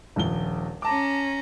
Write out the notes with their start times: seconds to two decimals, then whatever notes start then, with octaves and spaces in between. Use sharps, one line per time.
0.16 D#1 A#1 G7
0.82 C#4 A5 A#5 D6